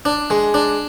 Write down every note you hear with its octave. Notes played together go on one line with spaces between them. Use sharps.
D4
G#3
D4